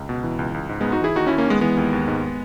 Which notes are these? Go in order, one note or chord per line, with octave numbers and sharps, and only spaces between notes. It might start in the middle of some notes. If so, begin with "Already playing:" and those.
Already playing: C#2
B2
E3
C#2
C#2
G#2
G#2 G#3 B3
D#4 F#4
E3 E4 G#4
D#2 D#4 F#4
D#2 C#4 E4
A#3 C#4
D#3 G#3 B3
E3 G#3 B3
D#2
D#2
G#2